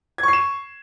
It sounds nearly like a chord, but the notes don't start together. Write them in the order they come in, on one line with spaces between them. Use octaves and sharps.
G#6 C#6 C7 E7